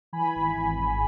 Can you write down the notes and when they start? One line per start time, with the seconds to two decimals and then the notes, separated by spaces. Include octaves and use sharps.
0.13 E3 G#5 B5
0.35 G#1
0.56 G#1
0.78 G#2